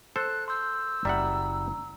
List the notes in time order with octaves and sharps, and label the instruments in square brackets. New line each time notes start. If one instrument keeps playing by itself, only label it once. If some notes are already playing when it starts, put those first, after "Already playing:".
[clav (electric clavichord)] A4 C5 [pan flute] F#6
[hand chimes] C6 G6 [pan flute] E6
[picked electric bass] F#1 [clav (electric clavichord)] G3 E5 F#5 [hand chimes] A#5